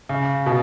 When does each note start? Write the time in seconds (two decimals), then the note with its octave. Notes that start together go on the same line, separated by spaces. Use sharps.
0.09 C#3
0.46 B2